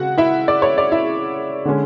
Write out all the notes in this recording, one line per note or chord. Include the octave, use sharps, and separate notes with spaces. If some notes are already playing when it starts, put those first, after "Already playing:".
Already playing: C#3 F#4 F#5
E4 E5
D5
C#5
D5
E4 E5
D3 G#3 C#4